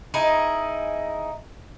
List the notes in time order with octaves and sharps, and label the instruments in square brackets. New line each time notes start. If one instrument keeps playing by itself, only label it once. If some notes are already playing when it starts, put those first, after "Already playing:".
[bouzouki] D#4 E4 G#4